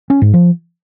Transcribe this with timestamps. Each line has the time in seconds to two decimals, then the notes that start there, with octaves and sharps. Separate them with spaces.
0.10 C#4
0.22 G#2
0.33 F3